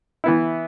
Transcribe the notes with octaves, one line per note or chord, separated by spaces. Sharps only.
E3 B3 E4